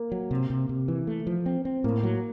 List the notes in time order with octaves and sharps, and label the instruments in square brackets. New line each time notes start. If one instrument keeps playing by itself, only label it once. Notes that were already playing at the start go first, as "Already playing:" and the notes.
Already playing: [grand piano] A#3
[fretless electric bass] F#3
C3
C3
C3
E3
A3
F3
C4
C4
[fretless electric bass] A2 [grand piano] A#3
[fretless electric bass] F#3